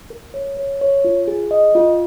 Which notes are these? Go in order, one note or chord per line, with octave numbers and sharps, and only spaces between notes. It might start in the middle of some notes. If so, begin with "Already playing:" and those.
A#4
C#5
C#5
C#5
F4
G#4
D#5
F4